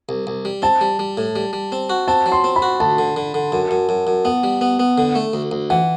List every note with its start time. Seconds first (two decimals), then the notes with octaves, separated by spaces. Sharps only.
0.09 C2
0.27 C2
0.45 G3
0.62 C4 A5
0.81 G3
0.99 G3
1.17 A2
1.36 G3
1.53 G3
1.72 C4
1.90 F#4
2.08 C4 A5
2.26 F#3
2.32 C6
2.44 C4
2.56 B5
2.62 F#4
2.80 D2 A5
2.98 D3
3.16 D3
3.34 D3
3.52 F#2
3.71 F#2
3.89 F#2
4.07 F#2
4.25 B3 F#5
4.44 G3
4.61 B3
4.79 B3
4.98 D3
5.15 A3
5.33 D2
5.51 D2
5.70 E3 F#5